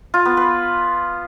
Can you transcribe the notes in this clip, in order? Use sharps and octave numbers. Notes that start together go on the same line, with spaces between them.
F4
B3
B4